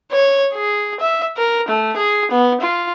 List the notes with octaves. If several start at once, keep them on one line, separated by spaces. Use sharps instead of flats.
C#5
G#4
E5
A#4
A3
G#4
B3
F4